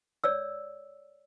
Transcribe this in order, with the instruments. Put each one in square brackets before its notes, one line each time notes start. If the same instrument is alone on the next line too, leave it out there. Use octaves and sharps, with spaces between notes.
[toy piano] C#5 D5 E6